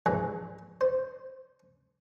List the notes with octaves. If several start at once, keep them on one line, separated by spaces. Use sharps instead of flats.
A#1 G#2 E3 G#3 B4
C5